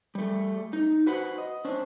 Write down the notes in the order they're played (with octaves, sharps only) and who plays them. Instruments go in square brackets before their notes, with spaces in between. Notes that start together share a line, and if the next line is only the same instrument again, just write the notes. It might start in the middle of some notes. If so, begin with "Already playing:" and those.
[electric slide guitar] G3 A3
D#4
F#4 B4 C5 F#5
D#5
C#4 D4 C5